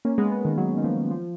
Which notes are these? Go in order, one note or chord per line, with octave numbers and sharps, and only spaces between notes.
A#3 C#4
G#3 B3
G#3 B3
D#3
D#3 F#3
D#3
F3
F3